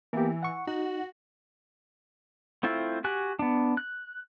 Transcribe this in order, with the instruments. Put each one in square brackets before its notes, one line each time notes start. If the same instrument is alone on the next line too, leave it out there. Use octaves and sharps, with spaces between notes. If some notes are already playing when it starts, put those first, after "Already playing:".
[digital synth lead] E3 [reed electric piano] A#3 B3 G4
[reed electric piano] F#5 C#6
[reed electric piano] D#4 [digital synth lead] F#4
[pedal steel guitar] A3 C4 E4 F4
F#4 G4 G#5 F#6
B3 D4
F#6